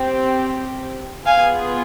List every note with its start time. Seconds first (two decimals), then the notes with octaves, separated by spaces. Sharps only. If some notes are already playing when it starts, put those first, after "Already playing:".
Already playing: C4 G4
1.25 B3 F4 G#4 F5 G#5